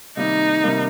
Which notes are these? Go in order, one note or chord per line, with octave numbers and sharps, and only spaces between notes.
C3 D#3 G3 A#3 D#4
C3 D#3 G3 A#3